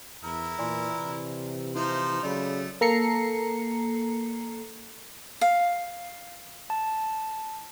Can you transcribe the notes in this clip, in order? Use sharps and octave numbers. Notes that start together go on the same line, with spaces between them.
E2 E4 A#4
A#2 E3 D5 G#5 C6
C3
F3 D#4 E4 C5
C#3 F#3 A3 D5 B5
A#3 A4 A#5 C7 C#7
F5
A5